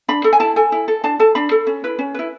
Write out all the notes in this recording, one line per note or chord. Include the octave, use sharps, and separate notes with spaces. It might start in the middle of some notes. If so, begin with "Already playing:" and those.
D4 B5
A4
G#5
E4 A5
A4 G#5
E4
A4
D4 A5
A4 A5
D4 B5
A4
C#4
E4 B4
C#4
E4 B4